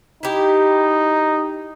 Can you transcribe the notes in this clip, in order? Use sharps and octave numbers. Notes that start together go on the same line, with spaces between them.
D#4 E4 G4